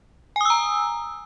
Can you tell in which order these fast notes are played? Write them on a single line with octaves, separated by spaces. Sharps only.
G#5 D#6 E6 A#5